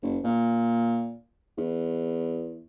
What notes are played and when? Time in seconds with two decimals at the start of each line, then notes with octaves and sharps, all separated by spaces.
0.02 F#1
0.24 A#2
1.57 E2